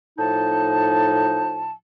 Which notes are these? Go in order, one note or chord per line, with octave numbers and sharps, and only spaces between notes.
A2 F3 D#4 A5